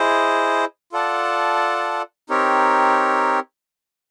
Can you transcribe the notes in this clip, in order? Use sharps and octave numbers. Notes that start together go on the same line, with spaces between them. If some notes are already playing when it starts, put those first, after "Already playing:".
Already playing: E4 G#4 C5 D#5
F4 A4 D5 F#5 A5
C4 D#4 G4 A#4 C#5